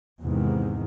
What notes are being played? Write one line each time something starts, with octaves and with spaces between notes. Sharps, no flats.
E2 G#2 C3 D#3